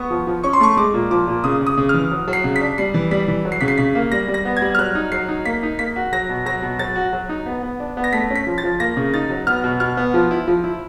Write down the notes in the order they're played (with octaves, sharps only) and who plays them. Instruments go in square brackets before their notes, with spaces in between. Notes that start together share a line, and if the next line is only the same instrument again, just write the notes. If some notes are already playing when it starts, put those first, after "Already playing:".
Already playing: [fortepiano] B3 [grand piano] C#6 D#6
[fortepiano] F3
F3
[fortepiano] C#4 [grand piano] C#6
[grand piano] C6
[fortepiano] A3 [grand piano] C#6
[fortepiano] G#3 [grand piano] D6
[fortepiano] A#2
[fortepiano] F3 [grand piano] D6
[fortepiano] A#2
[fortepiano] C#3 [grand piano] D#6
[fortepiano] C#3
[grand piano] D#6
[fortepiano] C#3
[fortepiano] E3 [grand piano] F6
[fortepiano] F#3
F#3
[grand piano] C7
[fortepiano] C#3
[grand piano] B6
[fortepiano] D4
[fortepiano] G3 [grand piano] C7
[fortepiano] E3
[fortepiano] G3 [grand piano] B6
[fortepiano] E3
F#3
[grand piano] C7
[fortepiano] C#3 [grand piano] B6
[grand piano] C7
[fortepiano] C#3 [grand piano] B6
[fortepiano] A#3
[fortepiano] G3 [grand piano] A#6
[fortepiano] G3
[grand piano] A#6
[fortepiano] B3
[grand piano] G#6
[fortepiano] G3
[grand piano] F6
[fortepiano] F#3 [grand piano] F#6
[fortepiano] D#4
[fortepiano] F#3 [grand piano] C7
[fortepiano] D#4
[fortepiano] A#3 [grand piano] B6
[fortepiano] D#4
[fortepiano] A#3 [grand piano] B6
[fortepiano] F#4
[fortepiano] F#3 [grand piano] A#6
[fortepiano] B2
[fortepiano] F#3 [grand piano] A#6
[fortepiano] B2
[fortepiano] F#3 [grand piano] A6
[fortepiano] F#4
F#3
D#4
B3
B3
D4
B3
[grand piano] A#6
[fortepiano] A3 [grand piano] B6
[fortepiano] C#4
[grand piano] B6
[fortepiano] F3
[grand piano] A6
[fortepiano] F3
[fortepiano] A#3 [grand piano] A#6
[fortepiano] C#3
[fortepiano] D#4 [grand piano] A6
[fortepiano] F#3
[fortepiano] B3 [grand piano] F6
[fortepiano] B2
[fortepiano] B2 [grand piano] F6
[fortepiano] B3
F3
E4
F3
E4